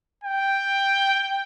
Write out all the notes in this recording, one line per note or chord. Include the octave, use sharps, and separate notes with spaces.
G5